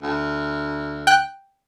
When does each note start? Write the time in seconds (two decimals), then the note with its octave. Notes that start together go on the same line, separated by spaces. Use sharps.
0.03 D2
1.07 G5 F#6